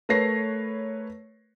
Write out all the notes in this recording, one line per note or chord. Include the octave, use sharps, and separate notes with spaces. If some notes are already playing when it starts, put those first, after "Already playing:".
A3 A#4 B4 C#5 A#6 C7